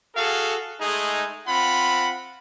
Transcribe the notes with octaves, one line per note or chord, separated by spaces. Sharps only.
F#4 G#4 A4 F5
G#3 A3 D#4 G#4
C4 F4 F#5 B5